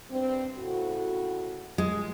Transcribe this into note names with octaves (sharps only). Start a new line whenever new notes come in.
G2 C4
A2 C#3 F#4
G#3